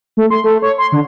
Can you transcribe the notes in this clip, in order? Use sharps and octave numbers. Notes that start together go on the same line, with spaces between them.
A3
C6
A3
C#5
C6
D3